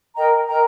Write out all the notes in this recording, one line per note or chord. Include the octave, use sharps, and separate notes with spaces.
A#4 D#5 G5 A#5
A#4 D#5 G5 A#5